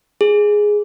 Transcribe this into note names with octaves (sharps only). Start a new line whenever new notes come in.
G#4